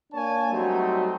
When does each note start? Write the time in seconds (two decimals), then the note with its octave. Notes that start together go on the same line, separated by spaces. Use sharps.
0.12 A#3 D4 C#5 G#5 A5
0.51 F#3 G3 A3 C4 D#4